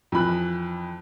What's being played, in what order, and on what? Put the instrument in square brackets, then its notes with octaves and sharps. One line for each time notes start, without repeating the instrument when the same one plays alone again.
[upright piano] F2 E3 B5 F#6